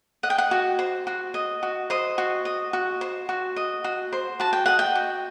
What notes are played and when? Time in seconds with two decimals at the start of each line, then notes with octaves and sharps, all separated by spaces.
0.23 D#5 F#5
0.30 G5
0.38 F#5
0.51 F#4
0.79 C5
1.07 F#4
1.34 D#5
1.63 F#4
1.90 C5 D#5
2.18 F#4
2.45 D#5
2.73 F#4
3.01 C5
3.29 F#4
3.56 D#5
3.84 F#4
4.12 C5
4.40 F#4 A5
4.53 G5
4.66 D#5 F#5
4.79 G5
4.95 F#4